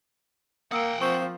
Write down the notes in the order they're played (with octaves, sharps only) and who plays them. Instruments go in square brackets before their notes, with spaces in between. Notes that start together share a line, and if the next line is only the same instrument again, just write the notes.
[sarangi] A#3 [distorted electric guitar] F#5 G5 [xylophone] D#6 E6
[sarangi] F3 [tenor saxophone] C4 [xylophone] C#6